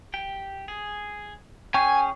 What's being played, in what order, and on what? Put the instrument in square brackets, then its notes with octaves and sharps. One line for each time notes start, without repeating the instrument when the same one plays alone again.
[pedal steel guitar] G4 G5
G#4
[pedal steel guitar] C#4 G#4 [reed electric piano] G5 C#6 [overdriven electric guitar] G#5